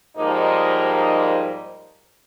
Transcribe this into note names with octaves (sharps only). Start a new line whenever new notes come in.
G#2 F3 G3 A#3 D#4